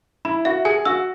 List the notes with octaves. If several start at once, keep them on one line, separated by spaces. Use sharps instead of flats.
E4 B5
F#4 E5
G#4 G#5
F#4 E6